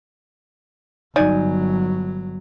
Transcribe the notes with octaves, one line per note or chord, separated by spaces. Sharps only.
G1 F#3 D#4 D5 G#5